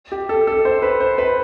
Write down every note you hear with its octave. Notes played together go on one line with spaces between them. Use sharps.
G4
A4
A4
C5
B4
C5
B4